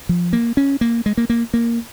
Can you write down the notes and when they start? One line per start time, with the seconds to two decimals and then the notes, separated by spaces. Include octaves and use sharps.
0.09 F3
0.33 A#3
0.57 C#4
0.81 A#3
1.06 G#3
1.17 A#3
1.30 A#3
1.54 A#3